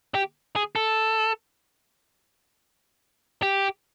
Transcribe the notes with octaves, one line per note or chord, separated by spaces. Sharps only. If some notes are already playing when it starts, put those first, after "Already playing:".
G4
G#4
A4
G4